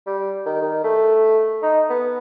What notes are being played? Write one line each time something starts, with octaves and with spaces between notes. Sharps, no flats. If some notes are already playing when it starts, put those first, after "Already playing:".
G3
D#3
D#3
A3
D#4
B3